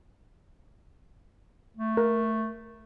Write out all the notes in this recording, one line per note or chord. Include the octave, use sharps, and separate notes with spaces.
A3
A#4